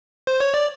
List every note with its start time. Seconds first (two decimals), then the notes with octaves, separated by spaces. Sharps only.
0.27 C5
0.40 C#5
0.54 D5